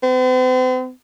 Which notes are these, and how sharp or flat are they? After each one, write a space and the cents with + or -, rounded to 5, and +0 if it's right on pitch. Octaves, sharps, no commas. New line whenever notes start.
C4 -45